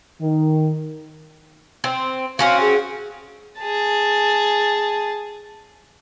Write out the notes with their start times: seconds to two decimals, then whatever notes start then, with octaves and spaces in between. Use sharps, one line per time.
0.20 D#3
1.84 C4
2.39 C4 C#4 F#4 F5
2.61 G#4
3.61 G#4 A5